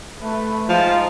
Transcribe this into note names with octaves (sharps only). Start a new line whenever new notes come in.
A3 B4
F3 G#3 D#4 F4